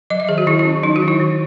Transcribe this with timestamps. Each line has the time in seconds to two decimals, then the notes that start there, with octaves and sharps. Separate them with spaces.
0.10 F#3 D#5
0.20 E5
0.29 D#3 G#4
0.38 F#4
0.47 D#3 E4
0.59 E4
0.65 C#4
0.83 F#3 D#4
0.96 F#4
1.02 D#3
1.08 E4
1.20 D#3